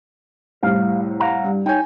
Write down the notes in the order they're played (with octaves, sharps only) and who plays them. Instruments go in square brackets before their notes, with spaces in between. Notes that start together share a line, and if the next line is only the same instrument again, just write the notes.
[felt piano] C2 A2 C3 [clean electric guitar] F5
[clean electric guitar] F5 F#5 A#5
[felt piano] G2
[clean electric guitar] D#4 C#5 [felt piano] G5 G#5